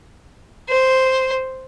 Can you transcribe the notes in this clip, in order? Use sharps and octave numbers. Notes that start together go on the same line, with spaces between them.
C5